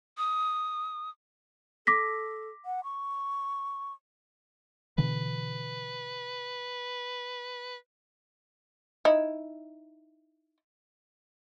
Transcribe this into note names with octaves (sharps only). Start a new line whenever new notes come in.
D#6
A4 D6 A#6 B6
F#5
C#6
B2 D3 E3 B4
D#4 E4